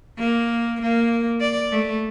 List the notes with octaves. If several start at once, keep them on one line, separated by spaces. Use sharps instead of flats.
A#3
A#3
D5
A3